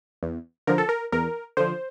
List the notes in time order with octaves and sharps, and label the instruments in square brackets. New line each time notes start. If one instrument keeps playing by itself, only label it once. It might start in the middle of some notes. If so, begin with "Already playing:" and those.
[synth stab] E2
D3 F3 A#4
A4
A#4
E2 A#4
D3 F3 C5